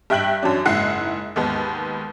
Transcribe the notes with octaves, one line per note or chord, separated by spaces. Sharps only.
G2 E5 G5 F#6 B6 F#7
F#2 F#3 D4
F#1 G#2 E4 F#5 C7
D#2 G#2 B3